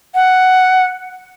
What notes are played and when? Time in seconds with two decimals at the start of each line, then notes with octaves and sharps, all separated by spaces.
0.15 F#5